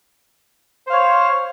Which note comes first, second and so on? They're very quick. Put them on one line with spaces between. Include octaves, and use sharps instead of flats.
C5 F5 C#5